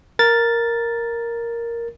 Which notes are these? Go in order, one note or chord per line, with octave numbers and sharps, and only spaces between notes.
A#4 A6